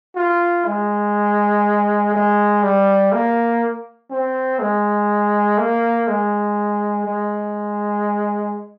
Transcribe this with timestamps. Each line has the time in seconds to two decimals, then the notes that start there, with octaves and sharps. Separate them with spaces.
0.16 F4
0.65 G#3
2.13 G#3
2.63 G3
3.12 A#3
4.10 C4
4.59 G#3
5.58 A#3
6.08 G#3
7.06 G#3